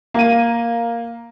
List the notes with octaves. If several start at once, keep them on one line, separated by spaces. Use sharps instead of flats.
A#3 D#7